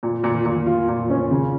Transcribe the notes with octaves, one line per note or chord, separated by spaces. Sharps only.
A#2
A#2
A#2
F4
A#2
C#4
C#3